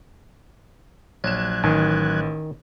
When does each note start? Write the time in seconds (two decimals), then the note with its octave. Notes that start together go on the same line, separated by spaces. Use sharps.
1.24 A#1 F#3 F#6 G#6 E7
1.63 A1 D#3 G#5